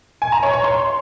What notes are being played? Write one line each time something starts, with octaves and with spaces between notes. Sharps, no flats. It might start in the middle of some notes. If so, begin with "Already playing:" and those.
G#5
A#5
C#5
C#5
C6